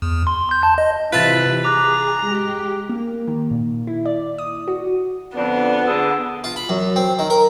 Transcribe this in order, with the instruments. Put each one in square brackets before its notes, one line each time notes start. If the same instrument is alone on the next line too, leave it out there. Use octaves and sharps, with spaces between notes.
[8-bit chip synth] E2
C6
G6
A5
D#5
[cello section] C3 E3 [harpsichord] F4 E5 A5 [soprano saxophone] B4
[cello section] G#4 [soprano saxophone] A#5 [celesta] D6 F#6
[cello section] G#3 G4
[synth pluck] A#3
D#3
A#2
E4
D5
D#6
F#4
[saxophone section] F2 D3 D4 [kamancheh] B3
[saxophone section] D3 G#4 A4
[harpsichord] F4
B5
F#2
C4
D#3
A#4